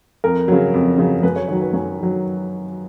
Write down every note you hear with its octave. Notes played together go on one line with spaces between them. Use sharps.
F2 A#4
C#3 F#3
F2
C#3 F#3
F#2 B4
C#5
D#3 F#3 C#5
B4
F#2 C#5
D#3 F#3